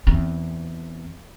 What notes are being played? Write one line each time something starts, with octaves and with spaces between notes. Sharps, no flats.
E2 C4